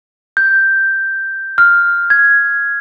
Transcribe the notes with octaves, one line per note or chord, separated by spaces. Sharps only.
G6
F6
G#6